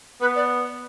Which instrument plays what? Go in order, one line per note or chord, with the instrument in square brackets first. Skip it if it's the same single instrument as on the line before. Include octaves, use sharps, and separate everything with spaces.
[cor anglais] B3 [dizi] B4
[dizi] D5